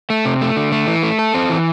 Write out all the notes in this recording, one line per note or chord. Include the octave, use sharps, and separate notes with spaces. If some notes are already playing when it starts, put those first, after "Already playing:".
A3
C3
A3
D3
A3
E3
A3
A4
C4
E3